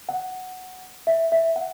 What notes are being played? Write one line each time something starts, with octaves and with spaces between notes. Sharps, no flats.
F#5
E5
E5
F#5